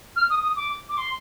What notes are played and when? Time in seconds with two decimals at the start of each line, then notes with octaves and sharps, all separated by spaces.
0.16 F6
0.30 D#6
0.43 D#6
0.56 D6
0.89 D6
0.98 C6